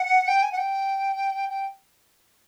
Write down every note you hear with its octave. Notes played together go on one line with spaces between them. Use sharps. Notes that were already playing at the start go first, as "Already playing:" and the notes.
Already playing: F#5
G5
G#5
F#5
G5
G5